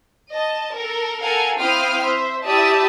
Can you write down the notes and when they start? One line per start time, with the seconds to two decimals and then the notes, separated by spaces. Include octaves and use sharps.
0.31 D#5 A5
0.73 A4 A#4
1.23 A4 A#4 F5 F#5 G#5
1.58 C4 E4 F5 G5 D#6 F6
2.03 C5 E5
2.45 E4 G4 D5 E5 A5 D#6